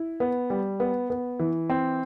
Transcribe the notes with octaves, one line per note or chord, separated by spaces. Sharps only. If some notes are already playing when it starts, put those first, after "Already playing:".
Already playing: E4
B3
G3
B3
B3
E3
C4